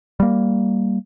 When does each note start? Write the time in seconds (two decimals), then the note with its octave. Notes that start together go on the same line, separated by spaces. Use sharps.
0.20 G3 A#3